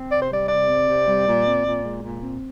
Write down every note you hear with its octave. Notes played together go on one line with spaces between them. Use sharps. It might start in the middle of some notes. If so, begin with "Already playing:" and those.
Already playing: C4
C3 D5
C5
G3 D5
C3 D5
C4
C3
G3
A#2
C4
A#2
G#3
A#2
C4